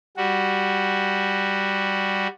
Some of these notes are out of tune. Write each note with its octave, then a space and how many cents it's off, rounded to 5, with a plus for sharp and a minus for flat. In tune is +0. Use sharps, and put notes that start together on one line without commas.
G3 +0 F#4 +0